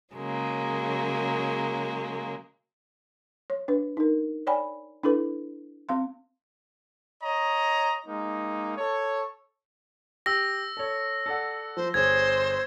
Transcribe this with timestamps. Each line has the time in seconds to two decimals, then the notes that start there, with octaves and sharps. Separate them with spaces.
0.14 C#3 F#3 G#3 A#3
3.50 C#5
3.68 D4 B4
3.97 D#4 A#4
4.47 C#5 D5 G5 G#5 B5
5.03 D4 E4 A4 B4
5.89 C4 F5 C6
7.23 C#5 D#5 A#5
8.07 G#3 A#3 D#4
8.78 A4 C#5
10.26 G4 E6 A#6
10.77 A4 C#5
11.26 A4 D5 F#5
11.77 F3 C5
11.94 G1 G#4 C5 C#5 G#6